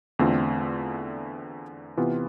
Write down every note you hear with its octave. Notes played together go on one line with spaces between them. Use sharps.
E2 D3 A3 C4 F4
C3 E3 B3 F4